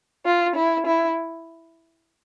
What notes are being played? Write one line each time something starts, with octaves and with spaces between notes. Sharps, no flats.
F4
E4
E4